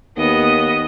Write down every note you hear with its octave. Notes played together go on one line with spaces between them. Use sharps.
D#2 B3 D#5